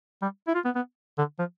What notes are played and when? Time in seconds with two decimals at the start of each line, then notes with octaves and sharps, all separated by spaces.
0.22 G3
0.48 E4
0.55 F4
0.65 B3
0.75 B3
1.18 D3
1.39 F3